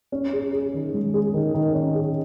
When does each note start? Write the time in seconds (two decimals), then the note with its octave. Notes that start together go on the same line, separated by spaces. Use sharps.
0.12 C#4
0.33 G#4
0.53 G#4
0.74 D#3
0.94 G#3
1.14 G#4
1.34 D#3
1.54 D#3
1.74 C#4
1.95 G#4